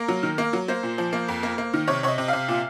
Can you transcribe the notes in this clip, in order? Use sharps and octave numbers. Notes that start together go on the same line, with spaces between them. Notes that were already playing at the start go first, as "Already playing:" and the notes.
Already playing: A#3 A#4
F#3
D#3
A#3
F#3
A#3 C5
A#2
F3
A#3
F2
A#3
A#3
D#3
C3 C#5
C3 C#5 D#5
C3
C3 F5
A#2